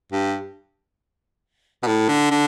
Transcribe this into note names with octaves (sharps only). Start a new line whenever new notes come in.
G2
B2
A2
D3
D3